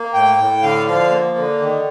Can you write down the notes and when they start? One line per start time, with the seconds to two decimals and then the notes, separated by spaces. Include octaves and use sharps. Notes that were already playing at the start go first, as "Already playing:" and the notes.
Already playing: A#3
0.13 A2 G5
0.38 A2
0.62 D3 F5
0.87 F3 F5
1.11 A#3
1.36 D3
1.60 D#3